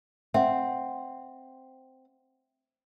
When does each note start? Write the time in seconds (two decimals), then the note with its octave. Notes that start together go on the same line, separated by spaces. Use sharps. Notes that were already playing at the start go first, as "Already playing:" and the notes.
0.34 C4 E5 F#5